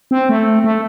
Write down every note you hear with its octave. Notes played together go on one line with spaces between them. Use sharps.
C4
A3
A3